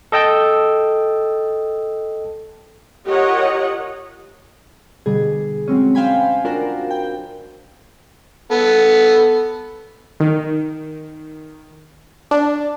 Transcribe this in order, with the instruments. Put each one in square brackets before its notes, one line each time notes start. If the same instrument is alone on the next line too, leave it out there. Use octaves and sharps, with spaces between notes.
[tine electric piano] A4 D#5 G5 A5 E6 G6
[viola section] F4 G4 A#4 C#5 D#5 F#5
[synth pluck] B2 D3 G3 G#4
F#3 G#3 C4 C#4
C5 F5 G5 G#5 B5
D4 F4 F#4 A#4 C5
G5
[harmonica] B3 A4
[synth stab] D#3
D4